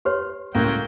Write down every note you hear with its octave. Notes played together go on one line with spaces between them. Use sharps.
G4 B4 C#5 C6
C#2 A2 C#3 F#3 A#3 F4 G5